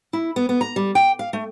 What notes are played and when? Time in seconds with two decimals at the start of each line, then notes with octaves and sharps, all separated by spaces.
0.13 E4
0.36 B3
0.49 B3
0.61 A#5
0.76 G3
0.95 G5
1.19 F5
1.33 A3